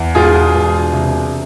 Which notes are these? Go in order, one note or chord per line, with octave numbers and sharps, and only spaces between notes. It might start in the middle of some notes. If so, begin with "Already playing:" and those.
Already playing: E2
E1 F4 G#4
E1
C3